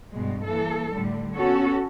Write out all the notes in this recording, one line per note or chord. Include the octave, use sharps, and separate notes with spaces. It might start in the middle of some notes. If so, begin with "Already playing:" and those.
G2 B2 G3 G#3
E3 A#3 A4
A2 D3 G3
B3 C#4 F#4 A4 C#5